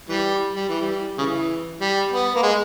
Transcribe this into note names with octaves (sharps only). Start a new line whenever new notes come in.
E3 G3
G3
E3
G3
C#3 E3
G3
B3
A#3
G#3